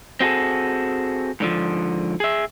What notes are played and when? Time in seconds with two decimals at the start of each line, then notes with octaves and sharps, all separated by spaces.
0.20 C4 F#4 G#4 A4
1.40 G#2 D3 F3
2.20 G#4 E5